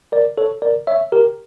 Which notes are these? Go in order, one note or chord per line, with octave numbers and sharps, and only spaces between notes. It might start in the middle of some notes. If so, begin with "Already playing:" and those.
A#4 D5
A4 C#5
A#4 D5
C#5 E5
G4 A#4